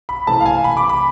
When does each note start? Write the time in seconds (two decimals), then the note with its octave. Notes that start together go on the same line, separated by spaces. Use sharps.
0.09 B5
0.27 C3 E3 A3 C4 A5
0.40 F5
0.46 G#5
0.64 B5
0.77 D6
0.89 B5